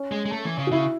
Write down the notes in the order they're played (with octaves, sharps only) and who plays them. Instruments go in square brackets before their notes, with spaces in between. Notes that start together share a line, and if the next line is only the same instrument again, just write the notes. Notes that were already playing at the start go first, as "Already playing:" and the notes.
Already playing: [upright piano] C#4
[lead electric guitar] G#3
G#3
A3
E3
C#3
[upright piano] F#4
[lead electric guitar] C#3 [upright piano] E4